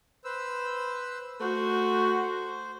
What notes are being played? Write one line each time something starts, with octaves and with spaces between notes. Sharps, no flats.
B4 C5 E6
A3 F#4 C5